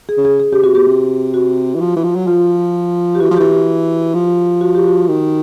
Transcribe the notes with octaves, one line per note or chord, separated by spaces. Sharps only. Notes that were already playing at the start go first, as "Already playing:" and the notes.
G#4
C#3
G#4
G#4
C#3 G4
C3 F#4
B2 G4
C3
F#4
E3
F3
E3
F3
F#3
F3 F4
G4
E3 F#4
F3
E3 G4
G4
F3
F#4
G4
F#4
D#3